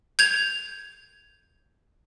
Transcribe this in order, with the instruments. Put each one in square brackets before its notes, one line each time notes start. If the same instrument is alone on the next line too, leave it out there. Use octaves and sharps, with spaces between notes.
[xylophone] G6 G#6 F7